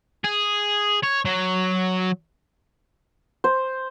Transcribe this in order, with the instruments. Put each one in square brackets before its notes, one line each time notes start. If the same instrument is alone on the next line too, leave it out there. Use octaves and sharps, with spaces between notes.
[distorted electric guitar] G#4
C#5
F#3
[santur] C5